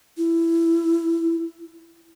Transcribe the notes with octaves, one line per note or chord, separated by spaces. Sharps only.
E4